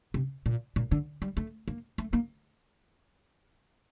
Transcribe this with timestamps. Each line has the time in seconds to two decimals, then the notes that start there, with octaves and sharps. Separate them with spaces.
0.14 C3
0.46 A#2
0.76 A#2
0.92 D3
1.22 G3
1.37 A3
1.68 A#3
1.98 A3
2.13 A#3